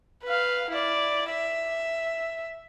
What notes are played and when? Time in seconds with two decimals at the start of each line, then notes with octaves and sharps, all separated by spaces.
0.24 B4 F5
0.71 E4 D5
1.30 E5